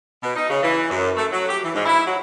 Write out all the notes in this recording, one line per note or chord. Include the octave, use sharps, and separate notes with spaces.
B2
D#4
C#3
E3
F#2
A3
F#3
G4
E3
G#2
E4
F#3